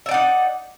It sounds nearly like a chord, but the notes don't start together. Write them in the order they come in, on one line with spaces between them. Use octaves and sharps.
E5 D5 F#5 D#4